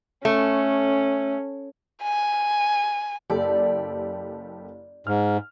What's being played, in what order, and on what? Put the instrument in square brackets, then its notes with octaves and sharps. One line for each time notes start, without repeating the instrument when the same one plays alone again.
[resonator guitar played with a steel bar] A3 [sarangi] C#4
[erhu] G#5
[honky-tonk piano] F#1 G4 A4 [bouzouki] D5
[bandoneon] G#2 [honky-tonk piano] F6